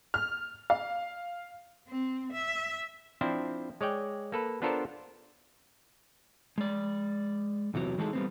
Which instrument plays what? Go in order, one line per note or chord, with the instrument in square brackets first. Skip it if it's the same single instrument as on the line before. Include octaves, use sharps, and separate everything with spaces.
[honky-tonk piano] F6
F5
[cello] C4
E5
[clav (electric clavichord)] F3 C4 D4 E4 C5
G#3 C#5 D5 G5
A#3 A4 B4
B3 D4 F4 A4 A#4 C5
[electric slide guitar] G#3 D5
E2 C3 E3 F#3
E3 G#3 D#4 G#4 A4
G3 B3 C4